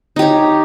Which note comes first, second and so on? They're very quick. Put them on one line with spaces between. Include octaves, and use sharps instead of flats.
D#4 G4 C#5